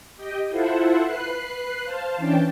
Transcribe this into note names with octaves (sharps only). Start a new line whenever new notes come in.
G4 D#5 G5
E4 F4 A4 C5 E5 F#5
B4 F#6 C7
C5 F5 A5
E3 C#4 D4 G5 A5